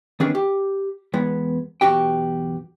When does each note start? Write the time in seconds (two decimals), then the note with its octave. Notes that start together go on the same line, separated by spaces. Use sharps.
0.20 D#3 B3 C#4 D4 G#4
0.35 G4
1.14 E2 G#3 B3
1.81 B1 E2 F#4 G4 G5